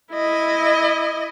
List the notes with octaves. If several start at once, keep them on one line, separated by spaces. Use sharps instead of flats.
E4 D#5